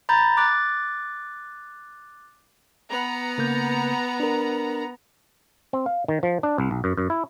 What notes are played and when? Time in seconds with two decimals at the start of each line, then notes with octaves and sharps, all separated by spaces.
0.09 A#5 B5 G6 A6
0.37 D6 F#6 A6
2.89 B3 A#5
3.38 C#3 A#3 G6
4.20 D4 A#4
5.73 C4
5.86 F5
6.08 D#3
6.23 F3
6.43 D4
6.58 C2
6.71 B1
6.84 F#2
6.97 F#2
7.10 E4